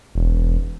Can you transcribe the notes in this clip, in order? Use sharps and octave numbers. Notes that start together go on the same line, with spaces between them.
E1